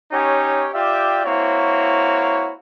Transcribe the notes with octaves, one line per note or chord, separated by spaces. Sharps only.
C#4 D#4 G4 C#5
F4 G4 D5 E5 G5
A#3 C4 E4 F#4 C#5